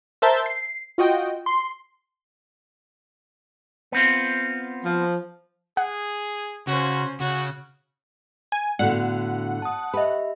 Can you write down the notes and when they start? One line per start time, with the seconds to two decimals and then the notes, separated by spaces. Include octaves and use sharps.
0.22 A#4 C5 E5 A5 G6
0.46 C7
0.98 F4 F#4 D#5 G5
1.46 C6
3.92 B3 C4 F4
4.84 F3
5.77 G#4 F#5
6.67 C#3 C#4 F#4 C5
7.20 C#3 F#4 F#5
8.52 G#5
8.79 A2 D3 B3 F#4 D5 F#5
9.62 A5 D#6
9.94 G4 B4 D#5 E5 B5